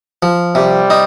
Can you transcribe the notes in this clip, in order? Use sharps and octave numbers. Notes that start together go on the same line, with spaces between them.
F3
C3 G3
D#4